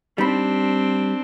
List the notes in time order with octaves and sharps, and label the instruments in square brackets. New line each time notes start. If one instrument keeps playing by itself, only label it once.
[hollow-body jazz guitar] G3 D#4 B5 [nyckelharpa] C4 D4